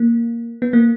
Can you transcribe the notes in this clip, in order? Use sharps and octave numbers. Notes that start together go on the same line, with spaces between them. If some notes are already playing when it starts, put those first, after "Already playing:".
Already playing: A#3
B3
A#3